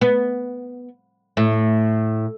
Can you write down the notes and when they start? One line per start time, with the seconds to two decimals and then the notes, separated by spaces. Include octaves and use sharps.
0.01 B3
1.37 A2